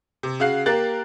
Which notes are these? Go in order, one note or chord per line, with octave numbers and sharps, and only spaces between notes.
C3
C#3 F#4 F5 F#6 C7
A#3 G4 A#4 F#6 A6